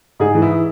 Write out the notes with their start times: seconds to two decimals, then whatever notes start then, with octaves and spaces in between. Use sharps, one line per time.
0.20 G#2 G#4
0.35 E3
0.42 E4